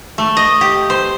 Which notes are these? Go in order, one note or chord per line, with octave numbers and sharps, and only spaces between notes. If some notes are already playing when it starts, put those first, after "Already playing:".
A3
D#5
G4
C5